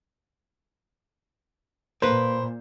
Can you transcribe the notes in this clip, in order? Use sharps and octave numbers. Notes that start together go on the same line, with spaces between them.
A#2 A#3 B4 C5